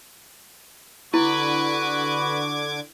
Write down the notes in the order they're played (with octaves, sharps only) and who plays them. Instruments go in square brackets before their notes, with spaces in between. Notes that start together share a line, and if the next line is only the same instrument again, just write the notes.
[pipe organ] D3 D6 G#6 [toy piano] E4 [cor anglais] F#4 [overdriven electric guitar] B4